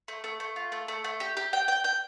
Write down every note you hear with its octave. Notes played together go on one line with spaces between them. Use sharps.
A3
A3
A3
F4
A3
A3
A3
G4
G4
G5
G5
G5